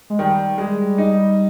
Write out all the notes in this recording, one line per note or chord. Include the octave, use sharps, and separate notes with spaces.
G#3
D#3 G3
G#3
D#4